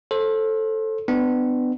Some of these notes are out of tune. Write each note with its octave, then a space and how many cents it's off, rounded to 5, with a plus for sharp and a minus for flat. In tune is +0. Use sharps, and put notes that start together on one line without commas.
A4 +0 C5 +30
B3 +25 D4 +30